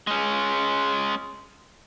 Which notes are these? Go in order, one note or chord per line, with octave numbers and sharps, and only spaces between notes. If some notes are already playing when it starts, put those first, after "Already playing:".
G#3 C#4